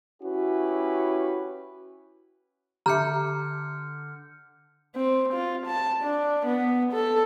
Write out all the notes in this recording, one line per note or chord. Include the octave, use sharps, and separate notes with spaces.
C#4 E4 F#4 G4 B4
D3 G4 E5 A#5 D6 F6 G6 C#7
C4
F4
A5
D4
B3
A4